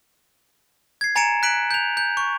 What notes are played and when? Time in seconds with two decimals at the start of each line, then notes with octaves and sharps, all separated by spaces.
1.01 G#6 C7
1.15 G#5 A#5 A6 C#7 D7 E7
1.43 F#6 B6 D7 F#7
1.71 G6 F7
1.97 G6
2.17 C#6